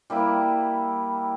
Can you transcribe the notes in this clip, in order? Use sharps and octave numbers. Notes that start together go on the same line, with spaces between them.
G3 A#3 E4